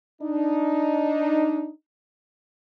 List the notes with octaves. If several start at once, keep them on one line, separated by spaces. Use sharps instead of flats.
D4 D#4